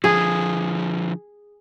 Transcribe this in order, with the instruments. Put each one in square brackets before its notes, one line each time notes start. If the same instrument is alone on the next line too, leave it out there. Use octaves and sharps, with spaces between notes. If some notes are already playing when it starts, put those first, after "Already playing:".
[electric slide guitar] D3 F3 [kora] G#4